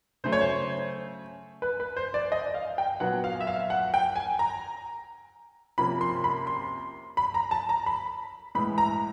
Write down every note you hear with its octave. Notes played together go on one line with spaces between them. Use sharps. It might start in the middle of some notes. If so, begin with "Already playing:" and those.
C#3 F#3 A3 C5
C#5
C5
B4
B4
C5
D5
D#5
F5
G5
A#2 F#3 B3 F#5
F5
E5
F5
F#5
G5
G#5
A#5
C3 F3 A#3 C#4 B5
C6
B5
C6
B5
A#5
A5
A#5
B5
A2 E3 G#3 B5
A#5